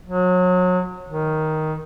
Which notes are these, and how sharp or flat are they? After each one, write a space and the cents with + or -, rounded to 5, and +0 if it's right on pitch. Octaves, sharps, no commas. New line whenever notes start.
F#3 -30
D#3 +5